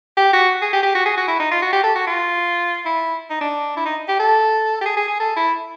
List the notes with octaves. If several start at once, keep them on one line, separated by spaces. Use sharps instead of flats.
G4
F#4
G#4
G4
G4
F#4
G#4
F#4
E4
D#4
F4
F#4
G4
A4
F#4
F4
E4
D#4
D4
E4
D#4
G4
A4
G4
G#4
G#4
G#4
A4
E4